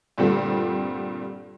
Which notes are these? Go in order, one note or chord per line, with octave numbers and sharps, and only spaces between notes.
G2 A#2 D3 G3 A3 C4